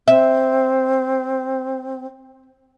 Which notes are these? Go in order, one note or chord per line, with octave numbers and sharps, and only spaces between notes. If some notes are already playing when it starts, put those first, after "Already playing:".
C4 E5